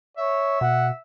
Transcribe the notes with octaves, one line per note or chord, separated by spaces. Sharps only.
C#5 E5
B2 F#5